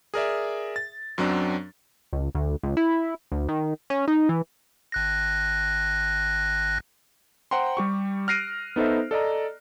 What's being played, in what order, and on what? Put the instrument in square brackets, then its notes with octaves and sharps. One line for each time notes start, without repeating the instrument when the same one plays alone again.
[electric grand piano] G#4 A#4 D5 E5
A6
F#2 F#3 C4 D4
[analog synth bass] C#2
D2
C#2
E4
D2
D#3
C#4
D#4
E3
[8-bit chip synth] G#1 F#6 A#6
[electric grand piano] C5 F#5 G5 A#5 C6
G3 G4 C#6
F6 F#6 A#6 C7 D7 D#7
B3 D#4 A4 C5 E5
A4 D5 D#5 A#5